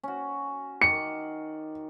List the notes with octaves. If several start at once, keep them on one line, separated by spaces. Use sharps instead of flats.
C#4 F#4
D#3 D6 C#7